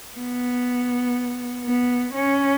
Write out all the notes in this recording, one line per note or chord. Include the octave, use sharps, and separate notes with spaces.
B3
B3
C#4